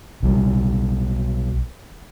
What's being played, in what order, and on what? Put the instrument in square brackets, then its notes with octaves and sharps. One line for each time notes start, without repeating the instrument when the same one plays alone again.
[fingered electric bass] B1 G3